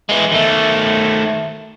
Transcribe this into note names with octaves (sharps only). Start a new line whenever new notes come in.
E3 G#3
D#3 A3